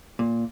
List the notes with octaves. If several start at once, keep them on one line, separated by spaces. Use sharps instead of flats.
A#2